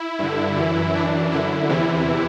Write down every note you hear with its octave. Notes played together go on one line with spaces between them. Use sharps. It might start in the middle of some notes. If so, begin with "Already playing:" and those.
Already playing: E4
G2 D3
F#2 E3
F#2 E3 D4
F#2 D3 E4
E2 C3 E3 E4